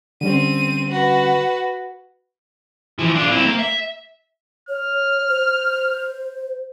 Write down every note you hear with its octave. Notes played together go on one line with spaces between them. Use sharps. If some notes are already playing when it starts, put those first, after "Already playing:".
D3 G3 C4 C#4 D#7
F#4 B4
E3 F3
D4 F4
C4 E4
A#3
E5
C#5 F6
C5